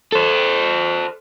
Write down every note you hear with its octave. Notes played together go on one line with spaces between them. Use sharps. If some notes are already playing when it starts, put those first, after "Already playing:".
A4 C5